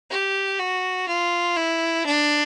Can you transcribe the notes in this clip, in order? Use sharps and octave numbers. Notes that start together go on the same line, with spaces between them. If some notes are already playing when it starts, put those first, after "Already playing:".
G4
F#4
F4
E4
D4